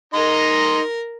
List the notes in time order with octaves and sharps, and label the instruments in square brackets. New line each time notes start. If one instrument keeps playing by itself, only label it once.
[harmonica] D#4 D#5 C6 [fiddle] A#4